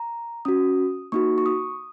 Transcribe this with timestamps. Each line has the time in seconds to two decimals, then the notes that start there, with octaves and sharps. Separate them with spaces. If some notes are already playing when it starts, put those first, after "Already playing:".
Already playing: A#5
0.45 C#4 F#4 D#6
1.12 A#3 D#4 F#4 C#6
1.38 C#6
1.46 D#6